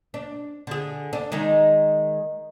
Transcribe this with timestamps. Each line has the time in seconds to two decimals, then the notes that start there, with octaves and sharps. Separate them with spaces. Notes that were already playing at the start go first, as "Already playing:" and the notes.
0.14 D4
0.67 D3 G#4
1.13 D4
1.32 D#3 G#3 D#4